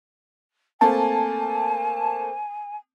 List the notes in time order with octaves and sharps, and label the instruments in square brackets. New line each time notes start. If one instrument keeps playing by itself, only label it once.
[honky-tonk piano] A3 A#3 C4 [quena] G#5 [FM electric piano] A5